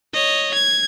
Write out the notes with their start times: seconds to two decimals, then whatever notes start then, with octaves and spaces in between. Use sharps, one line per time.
0.13 C#5 D#5
0.54 G#6